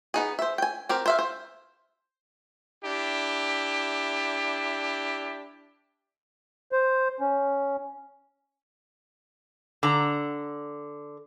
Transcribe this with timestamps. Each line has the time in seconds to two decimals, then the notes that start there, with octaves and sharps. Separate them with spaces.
0.14 B3 D#4 G#4
0.39 C5 E5
0.58 G5 G#5
0.89 C4 G4 A#4
1.06 C5 E5 F5
1.19 C5
2.85 D4 E4 G4
6.72 C5
7.21 C#4
9.83 D3 A#5